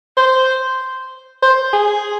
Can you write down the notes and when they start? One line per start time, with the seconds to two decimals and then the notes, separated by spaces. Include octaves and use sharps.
0.17 C5
1.43 C5
1.73 G#4